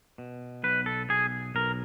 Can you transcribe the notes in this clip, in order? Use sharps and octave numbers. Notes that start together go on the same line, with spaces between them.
B2
B1 B4
A4
B1 G#4
B1 A#4